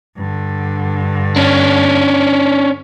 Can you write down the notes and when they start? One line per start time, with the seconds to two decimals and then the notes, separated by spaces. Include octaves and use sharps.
0.17 G2 D3
1.36 C#4 D4